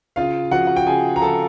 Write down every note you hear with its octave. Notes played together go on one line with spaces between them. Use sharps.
C#3 F4 F5
F3 F#4 F#5
F#5
G5
C#3 G#4 G#5
A#5
F3 A4 A5